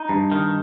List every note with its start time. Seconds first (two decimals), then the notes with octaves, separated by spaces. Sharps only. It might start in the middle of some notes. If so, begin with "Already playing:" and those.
Already playing: D#4
0.09 G2
0.32 D#3